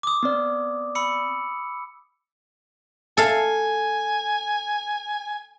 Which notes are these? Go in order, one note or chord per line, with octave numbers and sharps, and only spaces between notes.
D6 D#6
B3 C4 D5
B5 E6 C#7
A4 F5 G#5